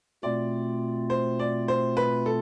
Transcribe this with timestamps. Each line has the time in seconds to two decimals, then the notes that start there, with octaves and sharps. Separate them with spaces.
0.23 B2 A3 C4 F4 D5
1.10 C5
1.39 D5
1.68 C5
1.97 B4
2.26 A4